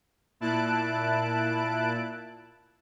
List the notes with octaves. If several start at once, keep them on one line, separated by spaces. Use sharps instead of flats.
A#2 E4 A5 F#6 D7